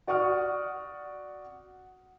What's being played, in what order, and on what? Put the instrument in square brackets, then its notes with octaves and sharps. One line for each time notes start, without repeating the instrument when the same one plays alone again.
[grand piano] F#4 D5 F#5 C#6 D#6 F6